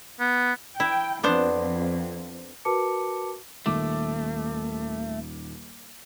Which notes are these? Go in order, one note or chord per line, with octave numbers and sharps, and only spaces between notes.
B3
E4 G5
F2 B3 D4 C5
F#4 A#4 B4 A5 D6 C#7
D#1 D#2 A3 D6